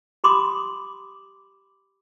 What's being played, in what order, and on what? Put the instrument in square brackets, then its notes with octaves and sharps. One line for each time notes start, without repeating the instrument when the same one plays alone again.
[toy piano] G4 B5 C6 D6 D#6